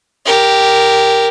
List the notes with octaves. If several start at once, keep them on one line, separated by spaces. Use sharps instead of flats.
G4 A#4